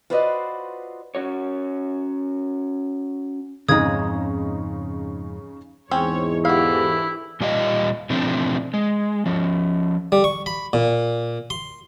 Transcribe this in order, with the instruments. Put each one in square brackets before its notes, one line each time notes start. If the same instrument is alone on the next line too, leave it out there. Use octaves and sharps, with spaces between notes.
[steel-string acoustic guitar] F4 F#4 B4 C5 D5 D#5
[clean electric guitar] C#4 F#4 C#5
[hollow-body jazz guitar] F2 G#2 G#3 [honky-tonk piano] C#3 D#4 [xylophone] D#6 G#6
[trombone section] E2 G#2 [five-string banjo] C4 C#4 [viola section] C#5
[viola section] D3 E3 G4 [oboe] E4 [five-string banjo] F#4 F5
[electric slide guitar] A#2 G3 F4 G4 D#5
B2 F3 A3 C4 D4
G#3
F3 C#4
[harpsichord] G3
C#6
B5
A#2
C6